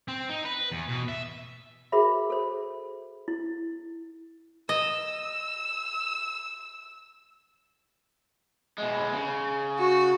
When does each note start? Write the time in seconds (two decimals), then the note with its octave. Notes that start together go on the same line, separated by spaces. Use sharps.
0.08 C4
0.30 D#4
0.45 B4
0.71 E2
0.89 B2
1.08 E5
1.92 F#4 G#4 A#4 C5 E5 B5
2.30 A4 C5
3.28 E4
4.69 D#5 E6
8.78 B2 G#3
9.13 C#3
9.77 F#4